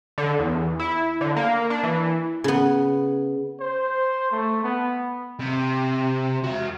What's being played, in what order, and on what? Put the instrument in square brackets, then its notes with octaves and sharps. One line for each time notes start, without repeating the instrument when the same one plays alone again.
[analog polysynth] D3
E2
E4
D3
A#3
D4
E3
[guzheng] C#3 B3
[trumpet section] C5
A3
B3
[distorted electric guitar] C3
F#4 E5